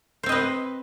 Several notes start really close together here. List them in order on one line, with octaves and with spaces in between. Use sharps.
C5 C4 D#5 B4